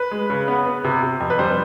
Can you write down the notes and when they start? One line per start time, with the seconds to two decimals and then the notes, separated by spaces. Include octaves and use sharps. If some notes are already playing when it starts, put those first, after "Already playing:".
Already playing: B4
0.11 G#3
0.30 C#3
0.48 B3
0.66 B3
0.84 C3
1.03 C3
1.20 F2
1.30 B4
1.39 G3 C5